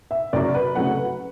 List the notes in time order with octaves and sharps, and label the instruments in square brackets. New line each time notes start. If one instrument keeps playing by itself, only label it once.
[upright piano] E5
F#2 C#3 F#3 D5
B4
C#3 F#3 A3 F#5
B4